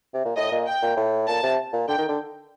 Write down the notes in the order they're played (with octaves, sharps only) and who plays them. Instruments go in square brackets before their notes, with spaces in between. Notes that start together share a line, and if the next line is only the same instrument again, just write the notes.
[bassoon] C3
A#2
[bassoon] A2 [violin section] D#5
[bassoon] A#2
[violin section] G5
[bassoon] A#2
A2
[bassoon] A#2 [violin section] A5
[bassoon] C3
A#2
[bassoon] D3 [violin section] G5
[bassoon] D#3
D3